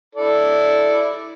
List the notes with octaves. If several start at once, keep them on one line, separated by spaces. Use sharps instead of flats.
E4 A4 D5